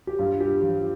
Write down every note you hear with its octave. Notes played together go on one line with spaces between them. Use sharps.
G4
G2 F4
G4
F3 F4